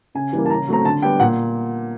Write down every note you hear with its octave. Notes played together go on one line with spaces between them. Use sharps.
C#3 G#5
E3 G3 A#3
A5
C#3 A#5
F#3 A3 C4 A#5
D3 A5
G3 B3 G5
A#2 F#5